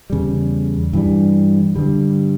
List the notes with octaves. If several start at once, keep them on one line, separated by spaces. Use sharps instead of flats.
E2 C#3 G3
G2 E3 G3
G2 D3 G3